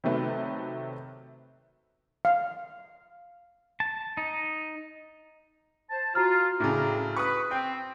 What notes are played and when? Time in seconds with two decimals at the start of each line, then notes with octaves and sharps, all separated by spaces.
0.04 C3 D#3 F#3 A3 B4
2.25 F5
3.80 A5
4.17 D#4
5.90 C5 A5
6.15 F4 F#4 A#5 F6
6.60 A2 C#3 C4 D4 A#4
7.16 B4 C#6 D#6
7.51 C4 G5